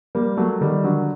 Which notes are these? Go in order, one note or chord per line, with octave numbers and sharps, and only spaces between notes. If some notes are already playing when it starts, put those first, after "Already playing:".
G3 A#3
F#3 A3
D#3 G3
D3 F#3